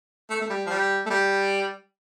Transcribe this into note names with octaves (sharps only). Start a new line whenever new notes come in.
A3
A3
G3
F3
G3
A3
G3